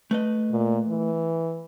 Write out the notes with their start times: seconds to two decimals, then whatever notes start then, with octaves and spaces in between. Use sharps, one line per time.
0.11 A3 B4 D#5
0.51 A#2
0.88 E3